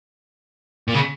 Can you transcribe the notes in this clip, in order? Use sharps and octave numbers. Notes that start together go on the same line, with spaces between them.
A#2
C#3